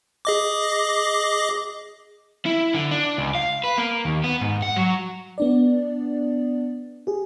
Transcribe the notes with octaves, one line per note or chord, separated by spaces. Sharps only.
G#4 D#5 D6
E4
D3
D4
C#2
F5
B4
A#3
D#2
B3
G#2
F#5
F#3
B3 D4 D5
G4 G#4